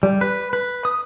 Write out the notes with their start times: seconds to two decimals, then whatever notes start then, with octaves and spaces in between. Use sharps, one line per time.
0.03 G3
0.21 B4
0.53 B4
0.85 D#6